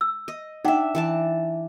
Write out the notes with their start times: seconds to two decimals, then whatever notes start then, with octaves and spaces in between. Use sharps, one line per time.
0.01 E6
0.28 D#5
0.65 D4 D#4 E5 F#5 G5
0.95 E3 D5 A5